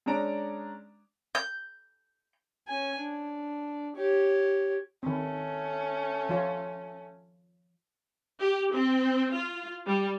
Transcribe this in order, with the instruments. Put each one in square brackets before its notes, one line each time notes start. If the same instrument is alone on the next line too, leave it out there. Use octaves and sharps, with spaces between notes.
[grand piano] G#3 C#4 D4 A#5 D7
[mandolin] G6
[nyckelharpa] C#4 G#5
D4
G4 C#5
[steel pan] D#3 C4 [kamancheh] A3 C#4
[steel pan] F3 F4 C#5
[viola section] G4
C4
F4
G3